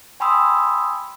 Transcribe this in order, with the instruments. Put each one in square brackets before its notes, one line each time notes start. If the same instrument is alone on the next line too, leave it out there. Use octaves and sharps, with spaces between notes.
[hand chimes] G5 G#5 B5 C6 D#6 E6